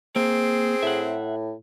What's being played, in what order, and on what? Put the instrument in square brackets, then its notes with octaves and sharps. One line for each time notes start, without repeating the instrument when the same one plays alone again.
[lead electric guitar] A#3 [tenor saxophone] C4 [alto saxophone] G#4
[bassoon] A2 [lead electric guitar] E5 F#5